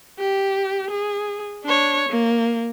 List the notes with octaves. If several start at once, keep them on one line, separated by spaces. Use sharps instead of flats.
G4
G#4
D4 C#5
A#3